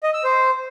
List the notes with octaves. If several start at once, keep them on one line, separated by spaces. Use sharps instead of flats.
D#5
E6
C5